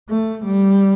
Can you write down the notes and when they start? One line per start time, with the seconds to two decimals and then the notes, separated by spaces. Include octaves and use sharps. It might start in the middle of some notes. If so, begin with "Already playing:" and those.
0.09 A3
0.46 G3